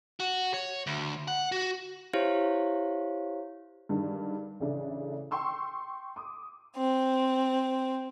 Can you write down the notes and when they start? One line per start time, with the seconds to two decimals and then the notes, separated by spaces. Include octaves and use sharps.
0.20 F#4
0.54 C#5
0.87 D2
1.28 F#5
1.52 F#4
2.13 E4 G4 C5 C#5 F5
3.89 G2 D3 D#3 G#3
4.60 A1 C#3 A3 D4
5.31 G5 C6 C#6 E6
6.16 D6 D#6
6.76 C4